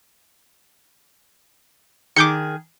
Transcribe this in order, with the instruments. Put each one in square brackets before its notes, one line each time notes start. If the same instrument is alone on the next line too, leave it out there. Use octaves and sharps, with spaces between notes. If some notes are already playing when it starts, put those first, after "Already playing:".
[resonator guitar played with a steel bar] D#3 G#4 [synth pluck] D6 G6 C#7